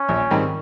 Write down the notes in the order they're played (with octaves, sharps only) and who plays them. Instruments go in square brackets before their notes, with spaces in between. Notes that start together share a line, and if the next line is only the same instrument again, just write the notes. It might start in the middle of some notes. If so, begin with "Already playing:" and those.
Already playing: [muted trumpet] C#4
[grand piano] A#1
G#2 D#3 G3 C4